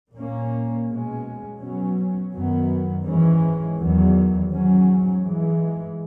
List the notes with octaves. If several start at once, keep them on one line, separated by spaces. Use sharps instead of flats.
A#2 A#3 C#4
B2 G#3 C#4
B2 F#3 C#4
F#2 D#3 F#3 B3
G#2 E3 G#3 C#4
E2 D#3 F#3
G#2 F#3 C#4
G#2 E3 G#3